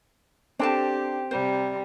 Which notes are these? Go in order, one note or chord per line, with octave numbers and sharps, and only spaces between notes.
C4 D4 G4 A4 A5
C3 G3 C5